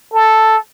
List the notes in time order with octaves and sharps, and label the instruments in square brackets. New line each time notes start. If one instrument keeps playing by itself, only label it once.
[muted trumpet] A4